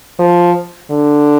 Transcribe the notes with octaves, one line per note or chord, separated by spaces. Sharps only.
F3
D3